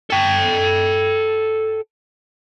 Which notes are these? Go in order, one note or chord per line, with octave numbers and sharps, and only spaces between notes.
A4 G5